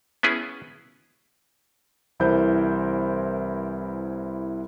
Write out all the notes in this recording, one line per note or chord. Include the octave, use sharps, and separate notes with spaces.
B3 C#4 E4 G#4
C2 E3 E4 A#4 C5 G6